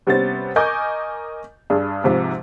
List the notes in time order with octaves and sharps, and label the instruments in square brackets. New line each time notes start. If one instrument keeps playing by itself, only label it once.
[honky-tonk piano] C3 G3 B3 C#4 C5 A6
A#4 D#5 G#5 C#6 D6 G6
G2 D4 G#4
G#2 C3 F3